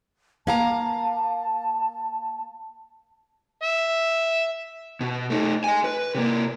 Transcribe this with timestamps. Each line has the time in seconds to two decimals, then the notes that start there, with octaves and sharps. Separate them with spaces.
0.47 A#3 F5 A5 A#5
3.63 E5
5.01 B2
5.30 A3 D#4
5.64 D#5 G#5
5.84 B4
6.15 C3 A#3